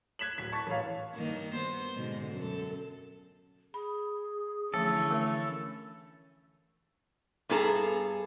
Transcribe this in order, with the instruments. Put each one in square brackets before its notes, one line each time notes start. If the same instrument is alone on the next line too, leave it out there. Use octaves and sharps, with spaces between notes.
[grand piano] F#6 G#6 B6 E7 F#7
D1 B6
A5 C#6 A6
A1 A4 C#5 F5
[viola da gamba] G2 D#3 A#3
B3 C5
G#2 B2 D3
F#2 A4
[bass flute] G#4 [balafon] B5
[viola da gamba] D3 E3 C#4 [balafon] F3 A3 [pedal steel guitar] A4
[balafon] A3 A#4
[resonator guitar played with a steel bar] G2 B3 G#4 A4 A#5